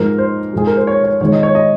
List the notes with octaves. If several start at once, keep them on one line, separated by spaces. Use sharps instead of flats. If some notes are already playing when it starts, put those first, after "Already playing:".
Already playing: G#2 F3 G#3 A#4
C5
G#2 F3 G#3 G#4
A#4
C5
C#5
C#5
G#2 D#3 G#3 C#5
D#5
C#5
D#5